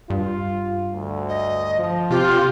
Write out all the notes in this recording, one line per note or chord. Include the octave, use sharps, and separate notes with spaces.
G2 F4
D2
D#5
F3
C3 F4 G4